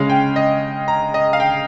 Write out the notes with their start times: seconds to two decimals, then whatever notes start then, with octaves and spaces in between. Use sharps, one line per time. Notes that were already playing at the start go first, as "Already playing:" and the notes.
Already playing: C#3 G#3 C#4 F5
0.10 G5
0.36 D#5
0.88 A#5
1.14 D#5
1.33 F5
1.40 G5